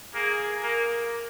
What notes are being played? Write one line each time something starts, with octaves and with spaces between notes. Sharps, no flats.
A#3 G#4
A#3 A#4